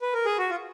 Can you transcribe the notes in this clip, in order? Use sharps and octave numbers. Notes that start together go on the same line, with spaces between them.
B4
A#4
G#4
F#4
F4